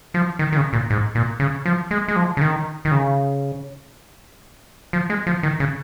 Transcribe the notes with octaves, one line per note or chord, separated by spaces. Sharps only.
F3
D#3
D#3
C#3
A#2
G#2
A#2
C#3
F3
G#3
G#3
F3
C#3
D#3
D#3
C#3
F3
G#3
F3
D#3
C#3